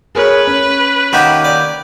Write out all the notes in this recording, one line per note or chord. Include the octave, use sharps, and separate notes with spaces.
G#4 A#4 B4 C#5
C#4
D#3 A#3 D#4 F#4 G4
D5